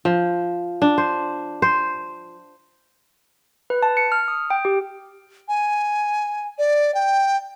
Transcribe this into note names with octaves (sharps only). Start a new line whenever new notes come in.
F3
D4
C5
C5
B4
A5
C#7
F6
D#6
G5
G4
G#5
D5
G5